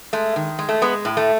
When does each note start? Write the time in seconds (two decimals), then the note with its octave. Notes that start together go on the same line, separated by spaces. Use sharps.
0.13 G#3 A3
0.36 D#3
0.59 G#3
0.69 A3
0.82 G#3 B3
1.05 A2
1.17 A3